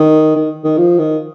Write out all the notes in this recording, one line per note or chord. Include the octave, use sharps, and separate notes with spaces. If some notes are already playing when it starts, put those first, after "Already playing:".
Already playing: D#3
D#3
D#3
F3
D#3